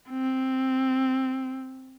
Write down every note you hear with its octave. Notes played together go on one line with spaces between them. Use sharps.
C4